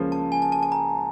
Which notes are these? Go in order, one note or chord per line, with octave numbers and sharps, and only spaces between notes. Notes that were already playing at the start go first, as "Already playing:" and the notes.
Already playing: C#2 C#3 F3 A#3 C#4
A5
G#5
A5
A5
A5
A#5